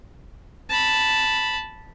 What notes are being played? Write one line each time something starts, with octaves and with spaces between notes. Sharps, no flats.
A5 B5